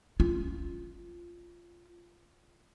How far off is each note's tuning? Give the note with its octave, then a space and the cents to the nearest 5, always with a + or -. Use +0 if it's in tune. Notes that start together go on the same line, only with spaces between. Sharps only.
C#4 +0 F4 -10